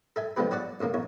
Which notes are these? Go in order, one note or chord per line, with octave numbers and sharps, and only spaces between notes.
A4 E5 G#5
D3 F3 G#3 B3 G4 B4
F#3 F#4 D5 F#5
A1 A2 C#3 A#3
A#1 E2 C#5